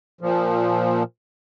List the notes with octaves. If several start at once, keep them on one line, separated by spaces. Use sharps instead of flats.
A#2 F3